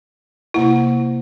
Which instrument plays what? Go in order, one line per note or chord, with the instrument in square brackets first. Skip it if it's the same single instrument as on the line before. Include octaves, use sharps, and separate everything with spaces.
[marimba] C3 A#3 F#5 [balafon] E4